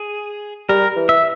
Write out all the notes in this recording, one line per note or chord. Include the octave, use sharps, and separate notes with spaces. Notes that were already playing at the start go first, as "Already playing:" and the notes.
Already playing: G#4
G3 A#4
E3
E5